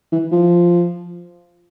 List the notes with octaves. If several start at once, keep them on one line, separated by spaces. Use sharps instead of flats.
E3
F3